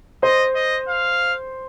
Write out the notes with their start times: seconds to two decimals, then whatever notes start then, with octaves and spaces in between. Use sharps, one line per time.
0.23 C5 D#5
0.56 D#5
0.88 F5